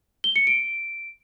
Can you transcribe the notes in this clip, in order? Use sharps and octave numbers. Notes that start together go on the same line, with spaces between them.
G7
C#7
D7